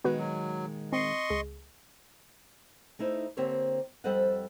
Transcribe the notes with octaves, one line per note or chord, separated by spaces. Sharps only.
A#2 D#3 G#3 B3 F#4 B4
F#3
C4 D#5 C6 C#6 C7
C#2 G#4
A3 D#4 E4 C5
D3 A#3 C4 G4 C5 C#5
F2 G3 A4 C5 D#5 F#5